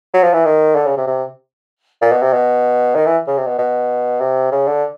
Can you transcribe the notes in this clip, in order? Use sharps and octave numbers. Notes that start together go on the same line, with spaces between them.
F#3
F3
E3
D#3
D3
C#3
C3
C3
A#2
B2
C3
B2
D#3
E3
C#3
C3
B2
B2
C3
C#3
D3